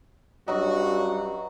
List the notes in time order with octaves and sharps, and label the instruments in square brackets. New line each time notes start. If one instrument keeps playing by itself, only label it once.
[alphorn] G2 [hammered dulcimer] F#3 E5 C#6 [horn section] C#4 D4 F#4 [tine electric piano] D#5